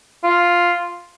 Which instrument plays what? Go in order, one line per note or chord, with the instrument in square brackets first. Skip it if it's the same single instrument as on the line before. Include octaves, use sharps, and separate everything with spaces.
[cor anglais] F4